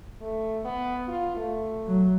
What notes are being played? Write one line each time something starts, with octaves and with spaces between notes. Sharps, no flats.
A3
B3
F4
A3
F#3